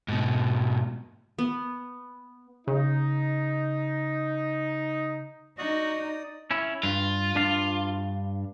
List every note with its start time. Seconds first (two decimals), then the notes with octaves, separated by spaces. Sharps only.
0.08 G#2 B2
1.39 B3
2.67 C#3 D#4
5.58 D#4 F#4 D5 D#6
6.51 C#4 E4
6.83 G2 F4
7.35 G2 D4 F5